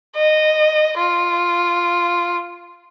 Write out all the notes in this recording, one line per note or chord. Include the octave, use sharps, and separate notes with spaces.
D#5
F4